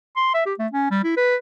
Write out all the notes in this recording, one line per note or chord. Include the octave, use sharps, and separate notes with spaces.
C6
E5
G4
A3
C#4
G3
E4
B4